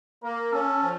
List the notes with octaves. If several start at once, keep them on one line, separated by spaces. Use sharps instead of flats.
A#3 A#4
C#4 A4
F3